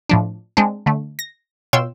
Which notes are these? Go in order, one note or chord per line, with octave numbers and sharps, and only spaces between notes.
A2 F3 D4
G#3 C4 D4
D3 A3
A#6
B2 F4 C#5 G5 C6 E6